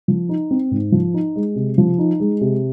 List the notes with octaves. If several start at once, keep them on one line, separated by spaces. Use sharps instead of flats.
F3
D#4
C4
G#2
F3
D#4
G#3
C3
F3
D#4
G#3
C3